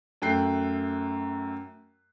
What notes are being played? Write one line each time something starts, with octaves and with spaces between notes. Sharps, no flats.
F#2 A3 G5 F#6 C7